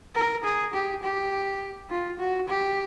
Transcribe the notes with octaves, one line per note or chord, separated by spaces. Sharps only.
A#4
G#4
G4
G4
F4
F#4
G4